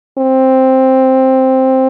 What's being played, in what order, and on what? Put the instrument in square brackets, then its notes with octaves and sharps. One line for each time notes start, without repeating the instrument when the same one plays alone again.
[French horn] C4